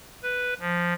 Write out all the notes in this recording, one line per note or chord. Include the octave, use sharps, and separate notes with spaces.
B4
F3